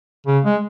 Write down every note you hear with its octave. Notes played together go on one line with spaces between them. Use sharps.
C#3
G#3